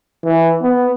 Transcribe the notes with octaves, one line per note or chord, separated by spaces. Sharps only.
E3
B3